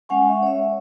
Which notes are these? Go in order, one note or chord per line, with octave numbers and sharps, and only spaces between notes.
G#3 C#4 F#5 G#5 C#6
E5
C#5 E5